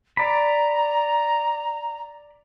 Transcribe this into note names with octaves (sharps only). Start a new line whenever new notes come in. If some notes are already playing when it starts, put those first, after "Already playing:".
D5 A#5 B5